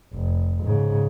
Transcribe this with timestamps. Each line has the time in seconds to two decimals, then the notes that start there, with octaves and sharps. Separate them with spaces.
0.13 F1
0.64 G#2 C#3